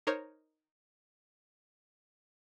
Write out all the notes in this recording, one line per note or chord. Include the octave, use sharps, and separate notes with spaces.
D#4 A#4 C5 C#5